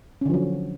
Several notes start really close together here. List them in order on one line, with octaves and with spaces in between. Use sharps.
C#4 D3 F3 F#3